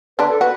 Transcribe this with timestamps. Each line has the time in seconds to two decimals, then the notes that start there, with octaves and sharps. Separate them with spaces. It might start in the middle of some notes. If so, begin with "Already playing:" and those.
0.19 D3 D4 B4
0.30 A4
0.41 F#4 B4